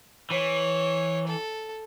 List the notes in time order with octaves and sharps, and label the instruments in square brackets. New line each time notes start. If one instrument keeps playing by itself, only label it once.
[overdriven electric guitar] E3 [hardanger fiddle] C#5
[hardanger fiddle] A4